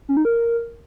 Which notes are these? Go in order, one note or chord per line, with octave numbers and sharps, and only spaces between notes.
C#4
D#4
A#4